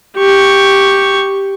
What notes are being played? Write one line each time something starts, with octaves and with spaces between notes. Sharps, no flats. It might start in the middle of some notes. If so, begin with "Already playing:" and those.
G4 C#6